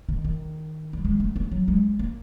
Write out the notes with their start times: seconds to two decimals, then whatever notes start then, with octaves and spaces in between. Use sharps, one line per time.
0.09 D#3
0.25 D#3
0.93 G3
1.05 G#3
1.20 A3
1.36 B3
1.52 F#3
1.68 G#3
1.99 A#3